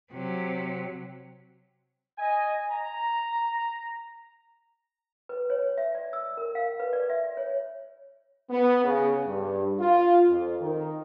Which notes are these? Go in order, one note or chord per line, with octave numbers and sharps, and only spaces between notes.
C3 F#3
D#5 G#5
A#5
B4
C#5
E5
D5
E6
A#4
F5
B4
D5
E5
C#5
B3
C#3
G2
F4
F2
D#3